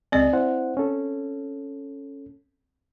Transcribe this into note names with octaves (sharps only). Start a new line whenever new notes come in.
C#2 G#3 C4 D5 D#5
E4 C5 F#5
C#4 A4